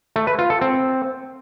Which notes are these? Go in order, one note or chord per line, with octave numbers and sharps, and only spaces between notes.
A3
B4
F4
A4
C4